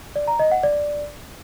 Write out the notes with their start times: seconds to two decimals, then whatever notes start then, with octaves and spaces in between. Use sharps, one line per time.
0.16 D5
0.28 A#5
0.39 D#5
0.51 F#5
0.63 D5